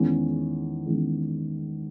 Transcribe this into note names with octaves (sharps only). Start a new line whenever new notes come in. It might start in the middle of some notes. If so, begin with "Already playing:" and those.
Already playing: E2 D#3 G#3 C#4
E2 D#3 G#3 C#4